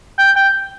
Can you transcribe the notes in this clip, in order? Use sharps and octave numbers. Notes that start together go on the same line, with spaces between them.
G5
G5